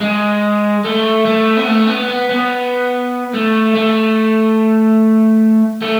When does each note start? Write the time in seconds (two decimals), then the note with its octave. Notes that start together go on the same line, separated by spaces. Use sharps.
0.01 G#3
0.84 A3
1.25 A3
1.57 B3
1.67 A3
1.87 B3
2.08 B3
2.29 B3
3.34 A3
3.75 A3
5.82 A3